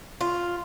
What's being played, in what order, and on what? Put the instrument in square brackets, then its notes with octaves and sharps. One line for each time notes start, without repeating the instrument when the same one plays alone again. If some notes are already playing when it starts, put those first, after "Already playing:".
[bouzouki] F4